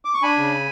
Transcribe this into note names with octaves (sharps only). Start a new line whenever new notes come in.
D6
C#6
D4 G#5 B5
C#3